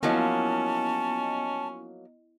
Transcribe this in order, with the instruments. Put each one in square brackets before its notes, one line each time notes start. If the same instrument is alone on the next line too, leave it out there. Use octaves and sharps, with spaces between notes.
[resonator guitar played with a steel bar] F3 F#3 A#3 [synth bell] B3 E4 D#5 [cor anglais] C#4 [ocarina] A5